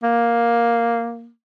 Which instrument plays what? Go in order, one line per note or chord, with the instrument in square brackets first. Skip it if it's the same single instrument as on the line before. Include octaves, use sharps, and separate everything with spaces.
[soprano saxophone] A#3